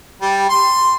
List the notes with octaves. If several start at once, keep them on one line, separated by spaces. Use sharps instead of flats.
G3
C6